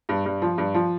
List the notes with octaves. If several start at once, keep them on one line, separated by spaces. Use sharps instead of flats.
G2
G2
F3
G2
F3